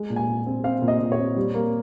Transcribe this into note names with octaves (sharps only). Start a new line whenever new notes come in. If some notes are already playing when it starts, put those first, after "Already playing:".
Already playing: G#3
A#2
G#5
A#2
C4
C4 F5
A#2
D#5
A#2
C#5
C4
G3
A#3